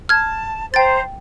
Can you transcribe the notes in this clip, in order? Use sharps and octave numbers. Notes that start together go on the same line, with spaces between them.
A5 F6 G#6
C5 G5 A#5 A6